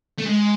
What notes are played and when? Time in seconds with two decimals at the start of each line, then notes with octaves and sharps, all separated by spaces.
0.18 A3
0.26 G#3